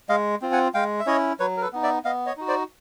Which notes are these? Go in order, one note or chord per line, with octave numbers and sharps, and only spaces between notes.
G#3 D#5 F5
C4 F4
F#5 G#5
G#3 F5 G5
E5
C#4 E4 C#5 D#5
F#3 B4 C#5
A#4
A4 B4
B3 D#4
D5 E5
B3 D#5 F5
C#5 D#5
D#4 F#4
C5 D5